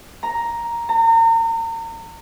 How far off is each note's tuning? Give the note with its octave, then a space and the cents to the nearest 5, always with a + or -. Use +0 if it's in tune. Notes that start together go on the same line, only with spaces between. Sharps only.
A#5 +5
A#5 -35